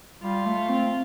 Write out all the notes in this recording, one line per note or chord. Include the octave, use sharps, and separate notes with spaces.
G3 F4
A3
C4